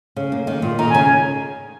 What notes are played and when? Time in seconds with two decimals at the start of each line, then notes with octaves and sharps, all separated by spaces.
0.16 C#3
0.32 A#3
0.47 D#3
0.62 A#2
0.79 D#3 A#5
0.89 G#5
0.94 C#3